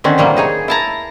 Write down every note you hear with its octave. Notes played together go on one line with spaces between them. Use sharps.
D3 D#3 C4 C#4 F#4
A2 C3 F#3 G3 A#3
D#4 G#4 C#5
E4 A5 A#5